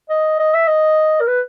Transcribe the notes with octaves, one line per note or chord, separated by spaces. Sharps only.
D#5
D#5
E5
D#5
A#4
B4